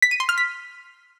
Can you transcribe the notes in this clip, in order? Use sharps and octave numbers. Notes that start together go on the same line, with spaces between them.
B6
D#7
C6
F6
B6